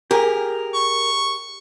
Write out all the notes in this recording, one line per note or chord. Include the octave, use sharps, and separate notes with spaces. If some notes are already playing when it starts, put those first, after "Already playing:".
G4 G#4 A#4
C#6